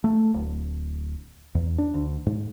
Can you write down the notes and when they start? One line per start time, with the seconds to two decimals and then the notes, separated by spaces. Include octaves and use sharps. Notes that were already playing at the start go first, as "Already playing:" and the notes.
0.04 A3
0.34 D1
1.55 E2
1.78 D4
1.94 D2
2.26 G#2